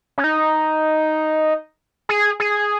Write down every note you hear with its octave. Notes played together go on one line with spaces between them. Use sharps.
C#4
D#4
G#4
G#4